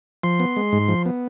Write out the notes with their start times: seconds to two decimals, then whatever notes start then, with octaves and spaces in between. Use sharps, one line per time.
0.23 F3 C6
0.40 B3
0.56 G#3
0.72 G#2
0.89 F3
1.06 B3